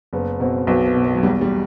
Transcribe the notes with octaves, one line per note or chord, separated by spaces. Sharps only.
F#1 B3
B2 C4
B1 B3
B3
B2
B3
F#3
E2 G3
G3